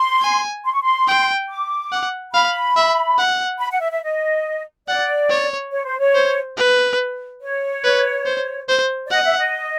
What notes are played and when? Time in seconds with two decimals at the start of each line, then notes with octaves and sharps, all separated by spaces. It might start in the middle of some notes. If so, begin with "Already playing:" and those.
Already playing: C6
0.22 G#5
0.65 C6
0.74 C#6
0.83 C6
1.07 G5
1.48 D6
1.92 F#5
2.33 F5 B5
2.76 E5
3.18 F#5
3.60 B5
3.71 F#5
3.81 E5
3.92 E5
4.03 D#5
4.88 D5 F#5
5.29 C#5
5.72 C#5
5.86 C5
5.99 C#5
6.15 C5
6.57 B4
7.42 C#5
7.84 B4
8.26 C5
8.68 C5
9.07 D5
9.10 D#5 F#5
9.25 E5
9.38 D#5